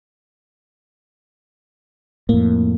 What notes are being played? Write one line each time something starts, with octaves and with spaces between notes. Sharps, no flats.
F2 A2 A#3